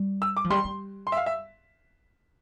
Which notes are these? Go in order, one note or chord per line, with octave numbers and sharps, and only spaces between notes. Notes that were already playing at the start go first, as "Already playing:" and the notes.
Already playing: G3
E6
D6
F3
G3 C6
G3
C6
E5
F5
E5